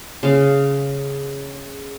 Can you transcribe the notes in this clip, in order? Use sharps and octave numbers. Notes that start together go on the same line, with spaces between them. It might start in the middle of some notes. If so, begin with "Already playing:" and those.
C#3 F5